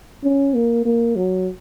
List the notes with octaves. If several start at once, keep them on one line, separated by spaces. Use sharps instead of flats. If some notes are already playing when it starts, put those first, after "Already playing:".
C#4
A#3
A#3
F#3